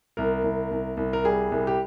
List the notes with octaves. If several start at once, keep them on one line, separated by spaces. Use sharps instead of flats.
C2 A#4
C2
C2
C2
A#4
G3 G#4
C2
G4